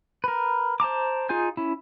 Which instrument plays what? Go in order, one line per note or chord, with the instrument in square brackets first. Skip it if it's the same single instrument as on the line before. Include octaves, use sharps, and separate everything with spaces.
[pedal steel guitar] A#4 B4
C5 A5 A#5 D6
D#4 F4 G#4 G#5 G6
C#4 E4